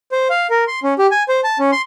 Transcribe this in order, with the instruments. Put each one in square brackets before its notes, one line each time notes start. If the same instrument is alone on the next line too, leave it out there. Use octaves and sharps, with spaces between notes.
[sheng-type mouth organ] C5
F5
A#4
C6
C#4
G4
G#5
C5
A5
C#4
C6